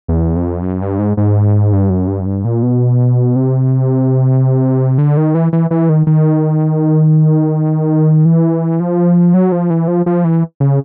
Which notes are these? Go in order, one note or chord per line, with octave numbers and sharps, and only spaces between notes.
E2
F2
F#2
G2
G#2
G#2
G2
F#2
G2
F#2
G2
A#2
B2
C3
D3
D#3
E3
E3
E3
D#3
D#3
E3
F3
F#3
F3
E3
F3
F3
E3
C#3